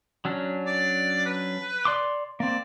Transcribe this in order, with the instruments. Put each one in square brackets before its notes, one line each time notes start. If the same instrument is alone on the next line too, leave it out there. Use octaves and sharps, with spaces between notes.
[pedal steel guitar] F#3 C#4 D4
[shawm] D5
B4
[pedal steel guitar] D5 C6 D6
[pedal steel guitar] A#3 C4 [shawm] D5